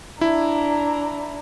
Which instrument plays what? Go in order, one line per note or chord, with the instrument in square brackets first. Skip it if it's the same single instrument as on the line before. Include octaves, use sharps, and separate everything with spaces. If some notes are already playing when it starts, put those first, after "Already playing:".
[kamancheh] D4 A#5 [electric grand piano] E4